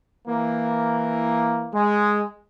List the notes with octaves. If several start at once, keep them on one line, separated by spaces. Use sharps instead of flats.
E3 A#3
G#3